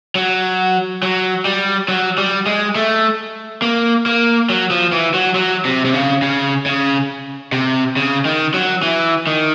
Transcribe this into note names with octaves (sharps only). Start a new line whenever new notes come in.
F#3
F#3
G3
F#3
G3
G#3
A3
A#3
A#3
F#3
F3
E3
F#3
F#3
C3
C3
C#3
C#3
C#3
C3
C#3
D#3
F#3
E3
D#3